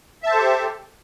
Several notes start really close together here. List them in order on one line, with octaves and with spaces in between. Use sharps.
E5 A5 C5 A4 G4